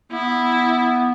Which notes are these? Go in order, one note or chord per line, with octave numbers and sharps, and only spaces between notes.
B3 E4